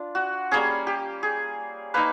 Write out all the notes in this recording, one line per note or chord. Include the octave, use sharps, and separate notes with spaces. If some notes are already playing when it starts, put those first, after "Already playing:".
Already playing: D4 F4
F#4
G3 A#3 C#4 G#4
G4
G#4
A#3 D#4 B4